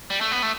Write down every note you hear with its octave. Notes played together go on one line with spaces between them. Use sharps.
G3
A3
B3
A3